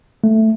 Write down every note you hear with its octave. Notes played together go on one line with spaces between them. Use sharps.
A3